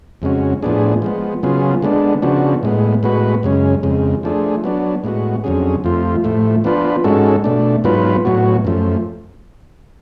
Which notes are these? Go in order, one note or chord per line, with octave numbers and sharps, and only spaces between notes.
F2 C#3 G#3 C#4 F#4
A2 F3 B3 D4 G#4
F3 G#3 B3
C#3 F#3 B3 F4 G#4
D3 G#3 B3 D4
C#3 F3 B3 D4 F#4
A2 G#3 B3
A2 G#3 B3 F#4 B4
F#2 C#3 G#3 C#4
F2 C#3 G#3
F3 A3 D4 G#4
F#3 B3 D4
A2 G#3 B3 F#4
F2 D3 F#3 C#4 G#4
F2 F3 A3 F4
A2 F3 A3
F3 B3 D4 F4 B4
G#2 G#3 C#4 F#4 A4
B2 A3 D4
G#2 F#3 B3 F4 B4
A2 F#3 B3 F#4
F#2 F3 A3